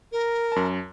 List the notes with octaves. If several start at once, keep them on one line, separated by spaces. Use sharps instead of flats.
A#4
F#2 A5